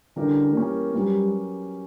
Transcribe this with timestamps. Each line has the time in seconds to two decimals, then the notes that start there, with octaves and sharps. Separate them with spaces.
0.16 D3 E3 G3 C#4 G4 A#4
0.55 E3 G3 A#3 C#4 G4 A#4
0.95 F#3 G3 A#3 C#4 G4 B4